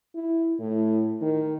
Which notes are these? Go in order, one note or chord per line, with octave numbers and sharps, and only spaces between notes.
E4
A2
D#3